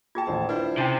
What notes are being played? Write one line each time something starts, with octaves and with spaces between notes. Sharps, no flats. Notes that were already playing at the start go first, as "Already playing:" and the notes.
F4 G#4 G5 A5 G#6
D#1 A1 C5
D4 E4 F4 B4 C5
C3 C#4 D4 G5 A6